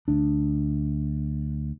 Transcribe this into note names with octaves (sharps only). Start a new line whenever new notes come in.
D2 D4